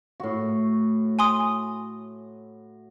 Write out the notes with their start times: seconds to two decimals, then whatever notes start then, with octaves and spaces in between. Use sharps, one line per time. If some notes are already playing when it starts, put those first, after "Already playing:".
0.20 A2 F#4
1.19 G#5 C6 D#6